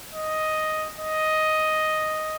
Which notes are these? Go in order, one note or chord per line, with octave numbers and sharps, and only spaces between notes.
D#5
D#5